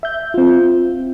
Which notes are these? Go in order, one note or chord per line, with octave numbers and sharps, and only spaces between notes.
E5 G6
C4 F4